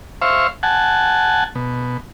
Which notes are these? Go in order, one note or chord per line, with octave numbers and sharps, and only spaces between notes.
C5 E5 F5 C#6
F#5 G#5 A5
B2